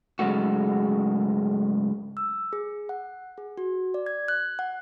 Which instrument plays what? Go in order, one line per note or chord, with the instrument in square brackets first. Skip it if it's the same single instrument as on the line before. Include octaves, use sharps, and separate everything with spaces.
[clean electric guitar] G#2 C#3 F#3 G#3 A3 F#4
[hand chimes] E6
G#4
F#5
G#4
F#4
D5
G#6
F#6
F#5